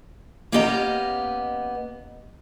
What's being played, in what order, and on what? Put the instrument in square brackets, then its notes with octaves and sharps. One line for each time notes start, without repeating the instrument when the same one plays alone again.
[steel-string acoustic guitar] A#3 B3 C#4 G4 D#5 A#5